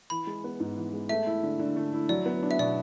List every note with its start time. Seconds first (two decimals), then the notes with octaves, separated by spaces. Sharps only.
0.10 E3 B5
0.27 G#3
0.44 B3
0.60 G#2
0.77 E3
0.93 G#3
1.09 A3 E5
1.27 E4
1.43 D3
1.59 D3
1.76 A3
1.93 E4
2.09 F#3 D5
2.26 B3
2.43 D4
2.51 E5
2.59 B2 D5